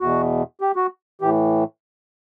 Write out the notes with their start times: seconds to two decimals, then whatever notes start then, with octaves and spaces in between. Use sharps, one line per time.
0.01 E2 B2 F#4
0.61 G4
0.76 F#4
1.21 A2 E3 G4